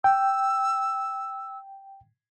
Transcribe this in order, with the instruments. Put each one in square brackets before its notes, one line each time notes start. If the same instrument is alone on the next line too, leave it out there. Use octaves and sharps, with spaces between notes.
[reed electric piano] G5 [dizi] E6